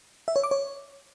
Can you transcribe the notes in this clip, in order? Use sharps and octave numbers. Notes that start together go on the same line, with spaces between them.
E5
C#5
D6
C#5